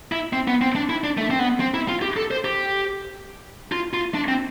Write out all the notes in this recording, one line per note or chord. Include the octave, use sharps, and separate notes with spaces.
E4
C4
B3
C4
D4
E4
D4
A3
C4
B3
C4
E4
F4
G4
A4
C5
G4
F4
F4
D4
C4